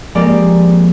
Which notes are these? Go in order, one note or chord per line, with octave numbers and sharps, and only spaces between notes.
F3 G#3 A#3 C4 G4 D5